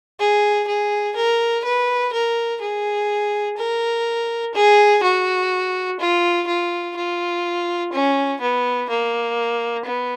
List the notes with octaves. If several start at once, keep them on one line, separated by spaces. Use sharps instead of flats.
G#4
G#4
A#4
B4
A#4
G#4
A#4
G#4
F#4
F4
F4
F4
C#4
B3
A#3
B3